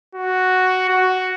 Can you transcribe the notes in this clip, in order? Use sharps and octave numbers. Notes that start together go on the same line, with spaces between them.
F#4
F#4